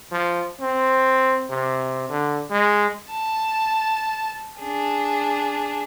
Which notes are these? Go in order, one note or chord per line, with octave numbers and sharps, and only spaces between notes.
F3
C4
C3
D3
G#3
A5
D4 G#4